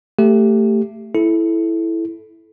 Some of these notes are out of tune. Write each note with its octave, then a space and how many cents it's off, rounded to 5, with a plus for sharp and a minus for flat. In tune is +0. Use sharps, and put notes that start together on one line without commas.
A3 +20 G4 +5
E4 +0 A4 -20